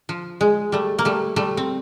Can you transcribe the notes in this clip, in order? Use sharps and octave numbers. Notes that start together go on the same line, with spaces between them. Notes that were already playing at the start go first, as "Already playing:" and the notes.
F3
G#3
G3 A3
A#3
G3 A3
G3 A3
C4